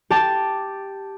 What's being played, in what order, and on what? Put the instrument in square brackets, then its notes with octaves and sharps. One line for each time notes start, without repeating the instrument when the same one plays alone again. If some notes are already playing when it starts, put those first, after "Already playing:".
[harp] G4 A5